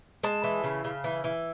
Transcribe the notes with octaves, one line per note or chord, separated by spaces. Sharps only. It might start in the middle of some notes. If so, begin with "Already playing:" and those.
G#3 A5
E3
C#3
C#3
E3
E3